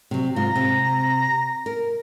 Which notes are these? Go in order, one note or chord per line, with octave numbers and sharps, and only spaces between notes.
C3 F#3
G#2 F4 A#5
C3 C4
A#4